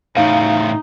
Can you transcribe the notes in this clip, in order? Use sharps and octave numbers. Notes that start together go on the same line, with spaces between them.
A2 C#3 D#4 F5